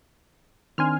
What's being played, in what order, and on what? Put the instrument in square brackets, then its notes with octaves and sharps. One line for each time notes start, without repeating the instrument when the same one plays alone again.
[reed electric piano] D#3 C4 D4 [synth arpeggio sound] G#5 C6 F6